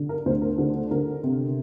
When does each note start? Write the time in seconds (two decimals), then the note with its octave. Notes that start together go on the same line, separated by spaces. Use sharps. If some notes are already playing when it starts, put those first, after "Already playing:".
Already playing: D3
0.09 A#4
0.26 D2 C5
0.42 A#4
0.58 D3 C5
0.91 D3 A#4
1.23 C3